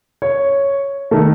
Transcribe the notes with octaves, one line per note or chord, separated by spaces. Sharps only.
C#5
D#3 A3